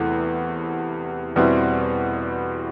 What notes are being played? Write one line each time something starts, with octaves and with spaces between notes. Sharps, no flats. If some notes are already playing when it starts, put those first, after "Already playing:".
Already playing: E2 C3 E3 A3
E2 B2 G3 C4 E4